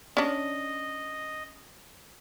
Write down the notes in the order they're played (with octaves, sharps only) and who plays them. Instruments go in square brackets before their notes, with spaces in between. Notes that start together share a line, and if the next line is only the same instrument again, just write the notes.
[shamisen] C#4 D4 [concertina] D#5